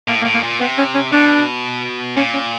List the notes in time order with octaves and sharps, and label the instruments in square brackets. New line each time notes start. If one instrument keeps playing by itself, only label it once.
[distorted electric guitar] A2 [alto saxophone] A#3
[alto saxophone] A#3
[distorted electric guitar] A2
[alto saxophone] A#3
[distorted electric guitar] A#2
[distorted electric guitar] C3 [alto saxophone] B3
[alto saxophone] C#4
C#4
[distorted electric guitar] B2 [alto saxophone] D4
[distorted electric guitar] A#2 [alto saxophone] C#4
[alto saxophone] C#4